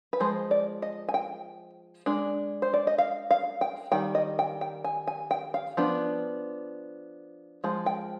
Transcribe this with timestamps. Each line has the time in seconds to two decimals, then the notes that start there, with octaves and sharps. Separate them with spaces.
0.13 B4
0.20 F3 G#3 C5
0.51 D5
0.82 D#5
1.09 G#5
1.14 G5
2.06 G#3 D4
2.62 C5
2.74 D5
2.87 D#5
2.98 F5
3.31 F5
3.61 G5
3.92 D#3 G3 G5
4.15 D#5
4.39 G5
4.61 G5
4.84 G#5
5.07 G#5
5.31 G5
5.54 F5
5.77 F3 B3 D4
7.64 F3 G#3
7.86 G5